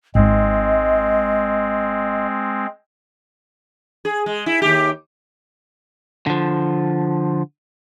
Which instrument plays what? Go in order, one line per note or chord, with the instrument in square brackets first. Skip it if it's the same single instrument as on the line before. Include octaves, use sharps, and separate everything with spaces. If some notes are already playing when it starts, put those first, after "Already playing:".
[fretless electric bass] G#1 G#2 [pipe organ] G#3 C4 [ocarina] D#5
[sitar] G#4
G#3
E4
D#2 G4
[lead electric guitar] D3 F3